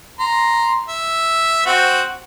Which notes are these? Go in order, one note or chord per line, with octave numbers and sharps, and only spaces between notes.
A#5 C6
E5
C4 F#4